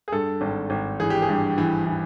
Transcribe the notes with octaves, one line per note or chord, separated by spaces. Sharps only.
G#4
G2 A4
G#1
G#1
E3 G#4
G4
G#4
G2
E3
E3